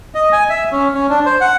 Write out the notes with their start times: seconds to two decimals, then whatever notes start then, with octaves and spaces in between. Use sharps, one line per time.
0.15 D#5
0.33 G#5
0.49 E5
0.72 C#4
0.94 C#4
1.10 D4
1.26 C5
1.41 F#5